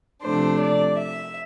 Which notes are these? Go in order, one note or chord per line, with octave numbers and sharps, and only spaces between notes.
C3 F3 A3 D4 C5
D5
E5